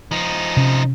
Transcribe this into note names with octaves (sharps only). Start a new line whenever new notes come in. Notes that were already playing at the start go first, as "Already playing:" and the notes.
F3 D#4
C3 C#4